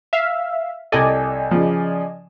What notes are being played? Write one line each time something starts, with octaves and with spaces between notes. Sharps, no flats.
E5 F5
C2 A4 D5 D#5 G#5
C#3 F3